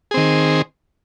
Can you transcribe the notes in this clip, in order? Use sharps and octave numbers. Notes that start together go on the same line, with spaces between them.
D#3 C4 G#4